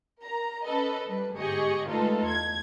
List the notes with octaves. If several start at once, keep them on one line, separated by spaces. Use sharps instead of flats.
A#4 A#5
C#4 A4 B4 D#5
G3 B4
G1 G#2 G4 G#4 D#5 C#6
G#3 A3 D#4 F4 A4 B4
E2 G#6